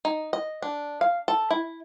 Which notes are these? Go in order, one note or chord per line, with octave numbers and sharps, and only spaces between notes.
D#4
D#5
D4
F5
A4
E4